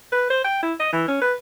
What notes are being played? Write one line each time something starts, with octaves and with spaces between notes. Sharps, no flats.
B4
C5
G5
E4
D#5
E3
C#4
B4